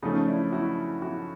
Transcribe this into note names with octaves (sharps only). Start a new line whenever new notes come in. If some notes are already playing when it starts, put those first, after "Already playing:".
C#3 F3 A3 C#4 D#4
D4 E4
E4 F#4
E4 F#4